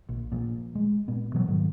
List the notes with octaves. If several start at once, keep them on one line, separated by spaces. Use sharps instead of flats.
A#1
A#2 F3
G#3
A#2 B3
B2 E3 F#3 B3
G#2 D#3 F#3